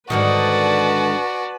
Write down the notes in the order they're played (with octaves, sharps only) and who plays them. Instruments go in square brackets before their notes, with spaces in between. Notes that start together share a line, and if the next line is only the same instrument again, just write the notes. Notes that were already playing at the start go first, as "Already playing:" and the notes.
[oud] G#2 D3 D#3 [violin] F#4 D5 [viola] B4 A5